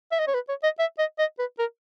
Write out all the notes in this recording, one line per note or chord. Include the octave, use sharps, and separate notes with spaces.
E5
D#5
C#5
B4
C#5
D#5
E5
D#5
D#5
B4
A#4